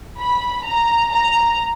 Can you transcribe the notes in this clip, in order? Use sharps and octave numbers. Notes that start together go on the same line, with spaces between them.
B5
A#5
A#5